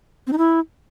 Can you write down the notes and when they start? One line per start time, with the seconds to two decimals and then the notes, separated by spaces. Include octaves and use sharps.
0.27 C4
0.33 D#4
0.38 E4